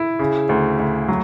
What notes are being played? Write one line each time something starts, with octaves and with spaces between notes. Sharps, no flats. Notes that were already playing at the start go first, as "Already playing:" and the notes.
Already playing: E4
C#3
D2
D2
F#3